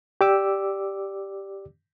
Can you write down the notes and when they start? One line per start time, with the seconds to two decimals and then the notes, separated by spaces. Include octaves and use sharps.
0.21 G4 D5 D6 E6